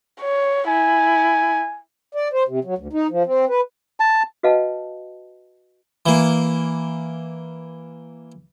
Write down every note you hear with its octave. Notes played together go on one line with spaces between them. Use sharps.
C#5
E4 G#5
D5
C5
C3
F#3
D2
D#4
F3
C4
B4
A5
F#4 B4 D#5 F5 F#5 A5
E3 A#3